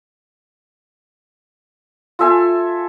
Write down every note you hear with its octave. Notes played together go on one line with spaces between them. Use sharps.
F4 A4 E5 G#5